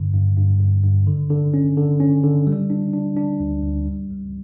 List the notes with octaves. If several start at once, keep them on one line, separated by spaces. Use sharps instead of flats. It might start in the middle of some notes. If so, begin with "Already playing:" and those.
Already playing: G2 D3
G2
G2
G2
G2
D3
D3
C#4
D3
C#4
D3
G3
D4
D4
D4
D2
D2
G3
C#2